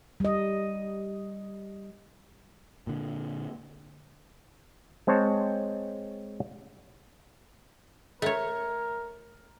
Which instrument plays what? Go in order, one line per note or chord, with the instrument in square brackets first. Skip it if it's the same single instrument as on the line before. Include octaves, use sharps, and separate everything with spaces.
[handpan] G3 D#5
[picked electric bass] A#2 D3
[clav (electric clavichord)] G#3 C4 C5 C#5 A5
[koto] A3 C#5 [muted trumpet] A#4